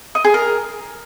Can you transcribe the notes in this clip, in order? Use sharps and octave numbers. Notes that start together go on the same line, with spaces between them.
D#5
G#4
A#4